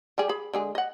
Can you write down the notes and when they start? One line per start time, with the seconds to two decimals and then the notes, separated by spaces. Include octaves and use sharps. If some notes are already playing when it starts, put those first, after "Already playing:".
0.18 G3 G4 G#4
0.29 G#4 B5
0.54 D3 G#3 G#4
0.75 D#5 F#5